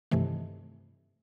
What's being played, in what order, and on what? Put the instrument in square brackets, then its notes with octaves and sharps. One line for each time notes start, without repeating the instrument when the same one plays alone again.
[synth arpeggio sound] G2 C3 D#3 E3 A3